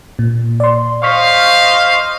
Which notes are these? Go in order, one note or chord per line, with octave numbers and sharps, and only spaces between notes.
A#2
D5 C6
C5 D#5 F5 C#6 F6 B6